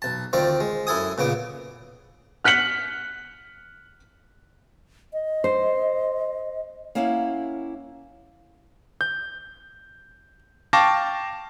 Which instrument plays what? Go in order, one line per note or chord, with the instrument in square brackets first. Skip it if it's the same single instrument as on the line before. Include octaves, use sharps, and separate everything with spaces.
[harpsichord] B1 A5
D2 D#3 C4 F4 D5
G#3
F#2 E4 A4 G#5 D#6
A#2 C#3 B3 D6
[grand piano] F6 F#6 B6 C#7 F#7
[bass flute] D#5
[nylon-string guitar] C5
A#3 C#4 E4 F5 F#5
[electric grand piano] G6
F5 G5 A5 C#6 D6 A#6